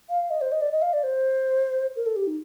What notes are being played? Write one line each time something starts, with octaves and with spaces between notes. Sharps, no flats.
F5
D#5
C5
D#5
D5
D#5
F5
D5
C5
A#4
A4
G4
D#4